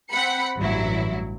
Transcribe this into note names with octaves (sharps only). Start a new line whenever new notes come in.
C4 F#5 B5 C#7
A1 G2 F#3 E4